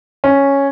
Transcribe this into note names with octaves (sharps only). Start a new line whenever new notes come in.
C#4